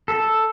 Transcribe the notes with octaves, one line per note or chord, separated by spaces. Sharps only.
A4